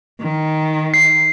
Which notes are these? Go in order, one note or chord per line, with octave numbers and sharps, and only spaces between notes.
D#3
C7